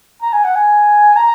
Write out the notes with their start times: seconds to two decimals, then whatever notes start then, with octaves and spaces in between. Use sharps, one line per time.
0.22 A#5
0.33 G#5
0.44 F#5
0.55 G#5
1.16 A#5